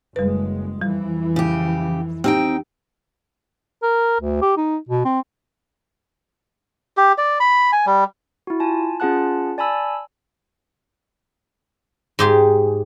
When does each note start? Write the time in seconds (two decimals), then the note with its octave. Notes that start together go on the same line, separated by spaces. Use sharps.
0.16 F#1 G3 G#3 B4
0.82 F2 E3 G3
1.36 C#3 G4
2.24 C4 D#4 G4 G5
3.83 A#4
4.20 D2
4.42 G4
4.57 D#4
4.89 B2
5.05 C4
6.97 G4
7.18 D5
7.40 B5
7.72 G#5
7.86 G3
8.47 E4 F#4
8.60 F4 G#5 A5
9.00 C#4 F4 G#4 F#5 A5 F#6
9.58 D5 G#5 A5 B5 E6
12.19 G#2 G4 G#4